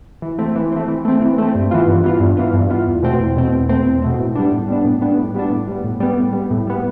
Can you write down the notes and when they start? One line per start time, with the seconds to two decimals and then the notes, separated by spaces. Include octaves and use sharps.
0.22 E3
0.39 A3 C4
0.56 E3
0.72 A3 C4
0.88 E3
1.05 A3 C4
1.22 E3
1.38 A3 C4
1.55 G2
1.71 E3 B3 F4
1.87 G2
2.04 E3 B3 F4
2.20 G2
2.37 E3 B3 F4
2.53 G2
2.70 E3 B3 F4
2.87 E2
3.03 B2 A3 C4
3.20 E2
3.37 B2 A3 C4
3.52 E2
3.69 B2 A3 C4
3.86 E2
4.02 B2 A3 C4
4.18 A2
4.35 G3 B3 D4
4.52 A2
4.68 G3 B3 D4
4.84 A2
5.01 G3 B3 D4
5.18 A2
5.35 G3 B3 D4
5.50 A2
5.67 G3 B3
5.84 A2
6.00 G3 B3
6.17 A2
6.33 G3 B3
6.51 A2
6.67 G3 B3